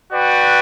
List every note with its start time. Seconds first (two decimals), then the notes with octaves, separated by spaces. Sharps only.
0.13 F#4 B4 D5 G5